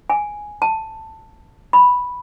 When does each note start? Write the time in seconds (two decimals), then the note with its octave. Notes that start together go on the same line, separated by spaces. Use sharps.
0.10 G#5
0.62 A5
1.73 B5